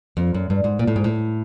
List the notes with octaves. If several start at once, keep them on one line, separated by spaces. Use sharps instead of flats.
F2
F#2
G2
G#2
A#2
A2
G#2
A2